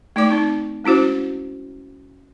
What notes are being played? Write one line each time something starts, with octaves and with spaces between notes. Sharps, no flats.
A3 D#4 D5 D6
C4 D#4
G#3 C#4 E4 F#4 C5